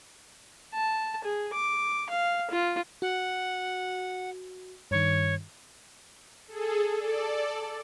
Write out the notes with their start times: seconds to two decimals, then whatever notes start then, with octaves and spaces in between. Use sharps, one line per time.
0.74 A5
1.24 G#4
1.53 D6
2.10 F5
2.51 F4
3.02 F#4 F#5
4.91 G2 D#3 C#5
6.48 G#4 A4
6.97 A4 D5